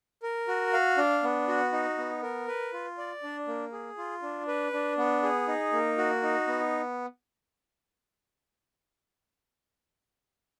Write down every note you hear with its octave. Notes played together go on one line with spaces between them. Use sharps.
A#4
F#4
F5
D4
B3
F#4
D#4
B3
A#4
B4
F4
D5
D4
A#3
G#4
F4
D4
B4
D4
B3
G#4
D#4
A#3
F#4
D#4
B3